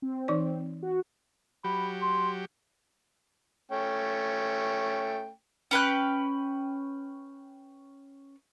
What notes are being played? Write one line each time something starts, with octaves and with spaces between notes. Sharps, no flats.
C4
E3 D#4 D5
F#4
F#3 G4 B5
C6
A3 C#4 G5
C#4 B4 G5 F#6